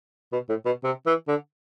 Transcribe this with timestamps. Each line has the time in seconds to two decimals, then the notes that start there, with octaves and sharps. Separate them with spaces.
0.33 B2
0.49 A2
0.66 B2
0.84 C3
1.06 E3
1.28 D3